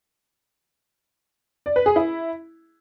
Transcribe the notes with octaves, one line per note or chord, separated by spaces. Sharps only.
D5
B4
G#4
E4